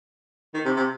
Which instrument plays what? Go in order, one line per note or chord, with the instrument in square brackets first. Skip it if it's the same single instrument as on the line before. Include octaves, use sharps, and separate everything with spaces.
[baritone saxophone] D#3
C3
C3